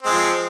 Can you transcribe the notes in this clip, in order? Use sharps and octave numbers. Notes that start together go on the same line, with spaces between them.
F3 G#3 C4